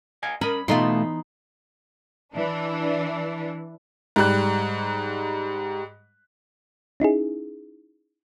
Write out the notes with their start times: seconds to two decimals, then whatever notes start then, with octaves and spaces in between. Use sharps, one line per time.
0.23 D#5 F5 G#5
0.41 C#4 A#4 D#5 B5
0.68 B2 E3 A3 B3 D#4 F4 B5 C6
2.34 E3 D4
4.16 G#2 G3 F#6
7.00 C#4 D#4 E4 G#4